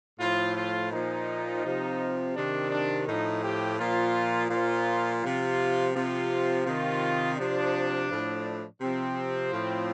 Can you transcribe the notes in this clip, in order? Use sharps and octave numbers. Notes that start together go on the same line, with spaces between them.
A2 F3 F4
F4
A#2 F3 D#4
C3 F3
C3 D#3 D4
D4
A2 F3 D#4
G4
A#2 F3 F4
A#2 F3 F4
C3 F3 F4
C3 F3 F4
C3 D#3 F4
C3 F3 D4
A2 F3
C3 F3 C4
A2 F3